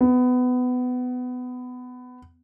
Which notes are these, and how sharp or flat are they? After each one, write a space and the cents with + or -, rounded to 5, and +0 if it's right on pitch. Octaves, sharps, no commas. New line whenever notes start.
B3 +20